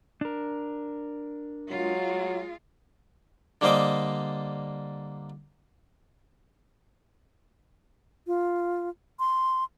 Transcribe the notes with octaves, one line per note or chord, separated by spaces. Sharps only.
D4 A#4
F#3 G#3 F4
D3 G3 A#3 C5 D#5 D6
F4
C6